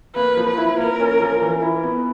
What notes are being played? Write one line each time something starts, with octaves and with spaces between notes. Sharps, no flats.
A#3 B4
F3
B4
E4
A#3 A#4
C#4
F3
E3
E4
B3